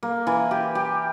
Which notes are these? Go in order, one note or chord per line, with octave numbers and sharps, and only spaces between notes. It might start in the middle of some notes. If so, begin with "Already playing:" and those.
A#3
E3
G4
G4